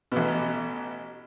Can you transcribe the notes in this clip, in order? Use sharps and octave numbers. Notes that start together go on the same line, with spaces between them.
A1 B2